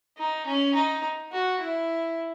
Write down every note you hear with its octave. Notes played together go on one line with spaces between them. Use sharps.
D#4
C#4
D#4
F#4
E4